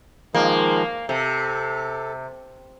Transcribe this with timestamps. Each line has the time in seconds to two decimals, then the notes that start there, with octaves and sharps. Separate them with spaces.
0.34 D#3 F3 G#3 A#3
1.09 C3 A4